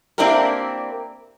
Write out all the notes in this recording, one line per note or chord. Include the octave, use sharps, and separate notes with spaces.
A#3 C4 D4 E4 G4 A#4